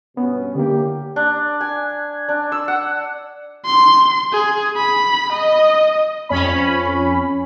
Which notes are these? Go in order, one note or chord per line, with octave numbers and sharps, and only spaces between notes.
G2 B2 B3 C#4
D3 A#3 E4 G4
D4
G#5
D4
E6
F#5
C6
G#4
B5
D#5
F2 C#4 B5